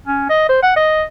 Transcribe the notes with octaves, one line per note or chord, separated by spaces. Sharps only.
C#4
D#5
C5
F#5
D#5